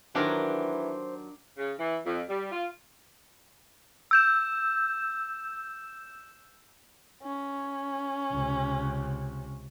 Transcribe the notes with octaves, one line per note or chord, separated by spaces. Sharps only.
D#3 E3 F#3 D4 G4 A#4 C5
C#3
E3
F2
G3
F4
E6 G6 E7
C#4
C#2 C3